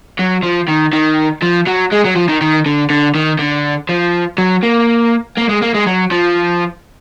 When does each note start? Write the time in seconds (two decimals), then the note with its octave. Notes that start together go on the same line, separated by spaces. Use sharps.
0.19 F#3
0.43 F3
0.68 D#3
0.93 D#3
1.42 F3
1.67 F#3
1.92 G#3
2.05 F#3
2.16 F3
2.28 D#3
2.41 D#3
2.66 D3
2.90 D3
3.15 D#3
3.39 D3
3.89 F3
4.38 F#3
4.63 A#3
5.37 A#3
5.49 G#3
5.62 A#3
5.74 G#3
5.86 F#3
6.11 F3